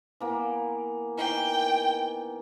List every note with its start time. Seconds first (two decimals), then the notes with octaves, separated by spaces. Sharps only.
0.20 E3 A#3 B3
1.18 D#3 E3 G5